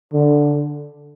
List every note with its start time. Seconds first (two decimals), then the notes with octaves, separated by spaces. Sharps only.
0.14 D3